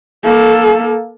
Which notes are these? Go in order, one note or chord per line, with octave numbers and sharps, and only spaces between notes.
A#3 A4